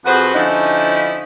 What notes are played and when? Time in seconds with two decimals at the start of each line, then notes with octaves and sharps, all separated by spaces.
0.05 F2 F#4 G#4 B4 C5 F#5
0.34 D3 F3 C#4 D#4 E4 C5